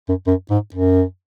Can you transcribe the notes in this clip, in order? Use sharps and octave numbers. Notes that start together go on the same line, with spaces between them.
F#2
F#2
G#2
F#2